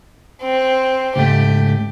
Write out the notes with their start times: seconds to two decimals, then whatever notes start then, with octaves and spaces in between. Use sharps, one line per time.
0.42 C4
1.16 C#2 G#2 A3 G4